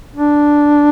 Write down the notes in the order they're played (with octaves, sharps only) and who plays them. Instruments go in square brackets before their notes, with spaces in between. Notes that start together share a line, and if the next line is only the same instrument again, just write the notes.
[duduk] D4